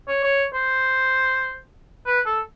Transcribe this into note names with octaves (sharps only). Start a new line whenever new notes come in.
C#5
C#5
C5
B4
A4